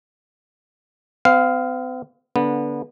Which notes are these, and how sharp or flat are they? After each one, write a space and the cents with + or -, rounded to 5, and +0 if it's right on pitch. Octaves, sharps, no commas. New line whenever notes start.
C4 -45 F5 +0
D3 -15 B3 -20